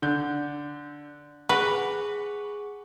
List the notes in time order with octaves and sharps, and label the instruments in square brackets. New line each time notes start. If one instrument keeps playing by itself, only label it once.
[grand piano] D3 G6
[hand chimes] G#4 C#6 [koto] B4 [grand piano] F#5